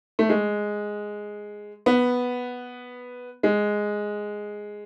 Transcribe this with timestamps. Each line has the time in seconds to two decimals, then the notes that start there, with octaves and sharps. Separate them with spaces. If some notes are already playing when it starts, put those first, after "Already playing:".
0.19 A3
0.29 G#3
1.86 B3
3.43 G#3